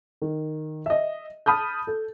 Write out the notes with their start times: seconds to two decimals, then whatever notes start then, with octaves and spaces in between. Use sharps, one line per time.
0.22 D#3
0.86 D#5 E5
1.46 A5 B5 D#6 F6 G6
1.87 A4